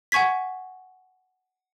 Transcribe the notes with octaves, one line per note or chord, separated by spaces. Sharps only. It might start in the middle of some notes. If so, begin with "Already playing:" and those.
F#5 G#5 C#6 G#6 B6